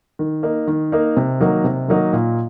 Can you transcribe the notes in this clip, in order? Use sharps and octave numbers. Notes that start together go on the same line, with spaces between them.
D#3
A#3 D#4
D#3
A#3 D#4
C3
D#3 F#3 A#3 D#4
C3
D#3 F#3 A#3 D#4
A#2